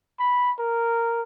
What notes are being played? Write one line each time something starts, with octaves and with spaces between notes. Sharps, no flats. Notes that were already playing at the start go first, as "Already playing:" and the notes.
B5
A#4